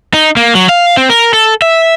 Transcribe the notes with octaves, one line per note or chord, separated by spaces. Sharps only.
D#4
A#3
F#3
F5
C4
A#4
A4
E5